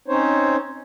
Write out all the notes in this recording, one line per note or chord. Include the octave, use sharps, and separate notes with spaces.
C4 C#4 D#4 C5 C#5